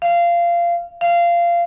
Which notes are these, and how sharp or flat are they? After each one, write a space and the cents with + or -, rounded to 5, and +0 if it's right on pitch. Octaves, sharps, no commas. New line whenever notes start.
F5 -20
F5 -20